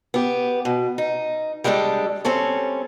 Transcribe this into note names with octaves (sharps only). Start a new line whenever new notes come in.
B3 G4
B2
D#4
G3 G#3 D4 G4 A4
G3 C4 C#4 A4 C#5